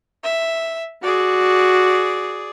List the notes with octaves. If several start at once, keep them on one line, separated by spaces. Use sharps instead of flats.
E5
F#4 G#4 D5